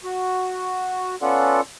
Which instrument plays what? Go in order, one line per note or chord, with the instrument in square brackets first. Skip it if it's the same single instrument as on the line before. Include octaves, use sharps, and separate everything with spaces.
[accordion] F#4
B3 C#4 F4 A4 D5 F#5